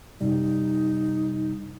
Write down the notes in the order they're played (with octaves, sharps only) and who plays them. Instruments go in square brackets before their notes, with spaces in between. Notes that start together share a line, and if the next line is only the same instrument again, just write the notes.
[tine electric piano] F#2 C3 G3 [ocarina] D#4